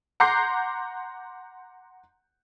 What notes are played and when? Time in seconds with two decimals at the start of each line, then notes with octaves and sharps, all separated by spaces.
0.20 F#5 A#5 C6 D6 G6 C7